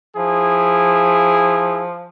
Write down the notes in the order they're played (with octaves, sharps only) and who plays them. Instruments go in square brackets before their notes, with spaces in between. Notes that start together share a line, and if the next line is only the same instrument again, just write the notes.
[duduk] F3 [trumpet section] E4 G#4